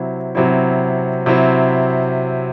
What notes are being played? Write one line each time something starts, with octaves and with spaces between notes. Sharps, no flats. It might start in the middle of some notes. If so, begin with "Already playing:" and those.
Already playing: C3 F#3 C4 E4
C3 F#3 C4 E4
C3 F#3 C4 E4